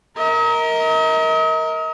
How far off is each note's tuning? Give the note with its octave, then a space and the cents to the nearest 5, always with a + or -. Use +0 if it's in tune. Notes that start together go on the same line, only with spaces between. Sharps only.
A#4 +0 D#5 +40